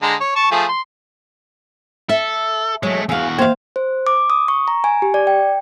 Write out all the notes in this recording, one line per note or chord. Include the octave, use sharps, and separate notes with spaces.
D3 G#3 A#5
C#5
A5 C#6
F3 A3 G#4
C6
A4 E5
F#3 G#3 A3
E2 F#4 G#4 F5
A#3 C5 E5 F5
C5
D6
D#6
C#6
A#5
G#5
G4
D5
G5